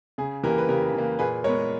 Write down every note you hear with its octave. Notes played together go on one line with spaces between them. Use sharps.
C#3 G#4
E3 A#3 G4 A#4
B4
C#3 G4 A#4
E3 A#3
A#2 G#4 B4
G#3 B3 A#4 C#5